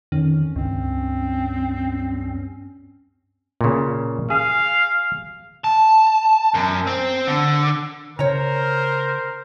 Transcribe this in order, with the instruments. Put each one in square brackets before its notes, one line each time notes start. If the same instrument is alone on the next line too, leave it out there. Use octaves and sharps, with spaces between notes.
[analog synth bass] F2 [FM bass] D#3 [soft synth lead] C#4
[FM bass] C#2 [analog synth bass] G2 [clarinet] C4
[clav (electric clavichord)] A#2 C#3
[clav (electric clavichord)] G#4 [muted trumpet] F5
[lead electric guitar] A5
F#2
C4
D3
[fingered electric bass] C#3 [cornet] A#4 [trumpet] C5 [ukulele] C#5 A#5